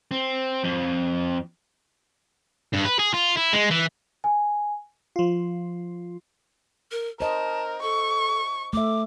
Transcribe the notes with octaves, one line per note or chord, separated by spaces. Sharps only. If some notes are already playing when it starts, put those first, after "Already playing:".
C4
F2
G2
B4
G#4
F4
E4
G#3
E3
G#5
F3 F4
A#4
A#4 C5 D#5 A5
A4 C#6
A3 E5 D6